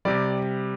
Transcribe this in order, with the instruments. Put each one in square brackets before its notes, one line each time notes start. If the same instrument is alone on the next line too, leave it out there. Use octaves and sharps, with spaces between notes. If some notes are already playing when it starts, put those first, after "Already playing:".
[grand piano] C3 G3 D5